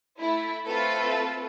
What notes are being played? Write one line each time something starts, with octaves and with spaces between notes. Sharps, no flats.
A3 E4
A3 C4 F4 A4 B4